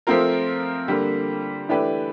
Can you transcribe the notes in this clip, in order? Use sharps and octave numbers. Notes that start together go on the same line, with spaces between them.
F3 A3 C4 F4 A#4
D3 G3 A#3
E3 A3 D4 G4 B4